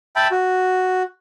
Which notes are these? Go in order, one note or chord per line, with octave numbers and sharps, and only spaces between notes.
E5 G5 A5 B5
F#4